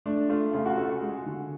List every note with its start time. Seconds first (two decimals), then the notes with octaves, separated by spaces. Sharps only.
0.06 A3 D4
0.29 A3 F4
0.53 C#3 F4
0.66 F#4
0.78 C#3 A4
0.90 F#4
1.01 G#3
1.26 D3